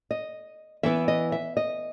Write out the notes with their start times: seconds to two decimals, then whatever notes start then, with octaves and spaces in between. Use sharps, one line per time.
0.11 D#5
0.83 E3 B3 E4 E5
1.08 D#5
1.32 E5
1.57 D#5